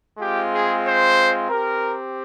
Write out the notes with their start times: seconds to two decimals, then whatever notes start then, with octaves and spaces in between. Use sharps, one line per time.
0.19 G#3 C4 F4 G4
0.52 G#4
0.85 C5
1.49 C4 G4 A#4